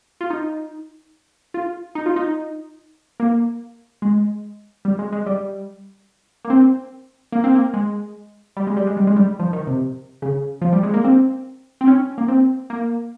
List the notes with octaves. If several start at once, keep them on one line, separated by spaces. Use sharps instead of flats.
F4
D#4
F4
D#4
F4
D#4
A#3
G#3
G3
G#3
G#3
G3
A#3
C4
A#3
C4
A#3
G#3
G3
G#3
G3
G#3
G3
G#3
G3
F3
D#3
C3
C#3
F3
G3
G#3
A#3
C4
C4
C#4
A#3
C4
A#3